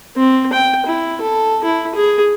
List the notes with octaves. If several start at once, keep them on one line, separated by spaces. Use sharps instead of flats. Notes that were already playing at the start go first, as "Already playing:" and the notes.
C4
G5
E4
A4
E4
G#4